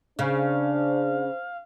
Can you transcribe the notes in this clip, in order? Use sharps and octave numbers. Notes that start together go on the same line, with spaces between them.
C#3 D4 C5 F5